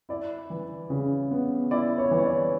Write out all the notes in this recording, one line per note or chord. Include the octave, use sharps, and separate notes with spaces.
E4 D5
E3
C#3
B3
E4 D5
C#5
E3
C#5
D5